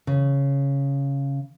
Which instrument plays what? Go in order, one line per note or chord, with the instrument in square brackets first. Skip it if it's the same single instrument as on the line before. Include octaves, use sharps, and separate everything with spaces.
[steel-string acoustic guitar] C#3